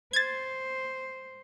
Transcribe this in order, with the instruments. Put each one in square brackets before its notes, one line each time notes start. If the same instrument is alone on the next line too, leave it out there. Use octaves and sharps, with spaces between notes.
[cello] C5 [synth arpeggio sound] G#6 A6